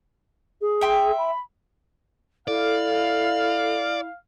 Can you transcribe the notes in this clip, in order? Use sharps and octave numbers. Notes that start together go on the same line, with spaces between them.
G#4
E5 G5 C6
B5
E4 A4 D5 F5